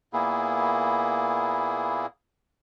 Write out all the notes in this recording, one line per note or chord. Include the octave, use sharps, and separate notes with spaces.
A#2 A#3 B3 E4 G#4